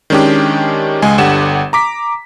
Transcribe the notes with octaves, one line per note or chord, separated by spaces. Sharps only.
D#3 G#3 C#4 D4 G4
C#2 G#3 G#4 G#5
G1 D3 G4 F#5 E7
A#5 D6 B6